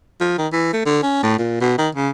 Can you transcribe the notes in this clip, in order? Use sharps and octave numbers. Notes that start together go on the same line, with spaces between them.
F3
D#3
E3
A3
D3
C#4
A2
A#2
B2
D#3
C#3